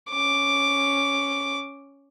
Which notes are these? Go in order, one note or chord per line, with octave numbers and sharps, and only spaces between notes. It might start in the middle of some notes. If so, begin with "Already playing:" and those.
C#4 D6